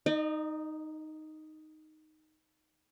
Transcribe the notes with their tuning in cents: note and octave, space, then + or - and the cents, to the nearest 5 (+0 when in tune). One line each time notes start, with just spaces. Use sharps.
D#4 +0 D#5 -40